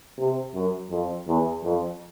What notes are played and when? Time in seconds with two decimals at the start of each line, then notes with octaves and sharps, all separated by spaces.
0.18 C3
0.54 F#2
0.91 F2
1.28 E2
1.64 F2